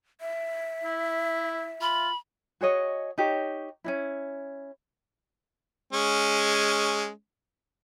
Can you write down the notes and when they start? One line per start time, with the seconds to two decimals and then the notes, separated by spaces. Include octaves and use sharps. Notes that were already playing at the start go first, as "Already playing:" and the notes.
0.21 E5
0.83 E4
1.81 F4 B5
2.61 F#4 G#4 C#5 D#5
3.18 D#4 G4 C#5
3.84 C#4 D4 E4
5.93 G#3 C#4